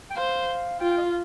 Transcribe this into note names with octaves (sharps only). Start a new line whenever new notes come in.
G5
C5 F5
F4 G5
G5
D#5
F5